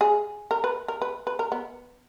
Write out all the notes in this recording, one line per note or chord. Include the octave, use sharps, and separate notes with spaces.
G#4
A#4
B4
A#4
B4
B4
A#4
B3